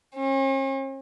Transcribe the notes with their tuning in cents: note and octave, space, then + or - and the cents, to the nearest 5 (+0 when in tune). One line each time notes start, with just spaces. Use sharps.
C#4 -45